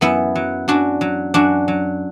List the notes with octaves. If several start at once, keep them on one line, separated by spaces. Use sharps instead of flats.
F#2 B3 E4
F#3
F#2 D4 F#4
F#3
F#2 D4 F#4
F#3